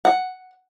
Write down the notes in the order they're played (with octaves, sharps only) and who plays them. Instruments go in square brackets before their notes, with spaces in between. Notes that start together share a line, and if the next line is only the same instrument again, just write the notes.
[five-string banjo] F#5